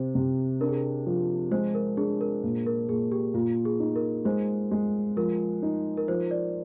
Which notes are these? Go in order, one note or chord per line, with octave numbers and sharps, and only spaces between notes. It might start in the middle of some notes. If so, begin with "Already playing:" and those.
Already playing: C3 C5
C3
D4 A#4
G#4
A#4
F3
G#3 C5
A#4
D4 G#4
A#4
A#2
A#4
A#2 G#4
G4
A#2 F4
G#4
D#4
A#4
G#3 C5
G#3
F3 A#4
D#4
A#4
F3 C5
D5